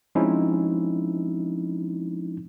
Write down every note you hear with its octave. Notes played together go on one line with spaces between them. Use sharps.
F3 G#3 C4 C#4 D#4 E4